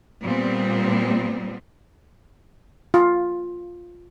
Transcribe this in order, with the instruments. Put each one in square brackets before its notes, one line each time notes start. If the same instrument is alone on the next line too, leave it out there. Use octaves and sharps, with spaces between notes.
[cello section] A#2 G3 B3 C4
[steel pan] F4